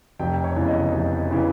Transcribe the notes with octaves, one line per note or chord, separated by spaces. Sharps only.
F1 G5
C#5
E2 C#3 E3
D#5
F1
C#3 E3